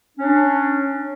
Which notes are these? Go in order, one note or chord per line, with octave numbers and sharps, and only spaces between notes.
C#4 D4